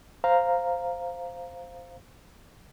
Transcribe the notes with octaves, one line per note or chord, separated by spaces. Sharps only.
C5 F5 A#5